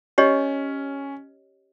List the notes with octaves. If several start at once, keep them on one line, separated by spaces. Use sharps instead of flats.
C#4 G4 C#5 D#5